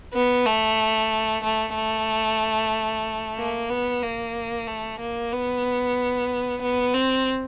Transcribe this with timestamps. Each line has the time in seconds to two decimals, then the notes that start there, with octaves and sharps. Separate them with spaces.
0.13 B3
0.46 A3
1.44 A3
1.75 A3
3.39 A#3
3.70 B3
4.03 A#3
4.68 A3
5.00 A#3
5.33 B3
6.62 B3
6.95 C4